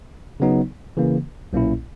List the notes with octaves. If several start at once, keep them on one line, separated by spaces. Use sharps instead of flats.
C#3 F#3 B3 D#4
C#3 E3 A#3
B1 A#2 A#3 C#4 E4